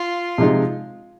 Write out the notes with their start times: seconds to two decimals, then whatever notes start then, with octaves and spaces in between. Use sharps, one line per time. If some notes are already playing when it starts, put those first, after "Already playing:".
Already playing: F4
0.38 C3 F3 G#3 D#4